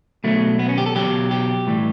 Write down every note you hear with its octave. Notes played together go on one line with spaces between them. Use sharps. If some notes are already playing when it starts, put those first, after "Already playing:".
B2 F#3 A3
B3
C#4
G4
A4
B2 F#3 G4
G4
A2 E3 G3